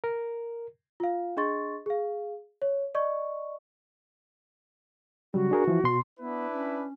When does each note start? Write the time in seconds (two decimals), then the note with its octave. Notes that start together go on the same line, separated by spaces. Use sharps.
0.04 A#4
1.00 F4 F5
1.37 D4 G#4 D#5 C6 C#6 A6
1.86 G#4 F5
2.62 C#5
2.95 D5 D#5 C#6
5.34 C#3 F#3 G3 F#4
5.51 D4 G#4 A#4
5.68 E3 F3 E4
5.84 B2 C6
6.20 B3 D4 E4 B4
6.54 C#4